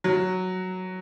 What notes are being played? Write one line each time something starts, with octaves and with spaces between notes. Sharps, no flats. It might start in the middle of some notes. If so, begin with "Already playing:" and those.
F#3